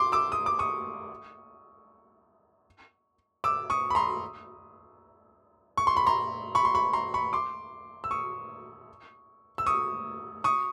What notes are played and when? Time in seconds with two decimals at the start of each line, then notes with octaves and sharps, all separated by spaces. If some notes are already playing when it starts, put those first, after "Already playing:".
Already playing: C6 D6
0.12 D6 E6
0.32 D#6
0.46 D6
0.59 C#6 D#6
3.44 D6 E6
3.70 C#6 D#6
3.90 B5
3.95 A#5 C6
5.77 C#6
5.87 C6
5.97 B5
6.07 A#5 C6
6.55 B5 C#6
6.65 C6
6.75 B5 C#6
6.93 A#5 C6
7.14 B5 C#6
7.33 C6 D6
8.04 E6
8.11 C#6 D#6
9.58 E6
9.66 C#6 D#6
10.44 C#6 D#6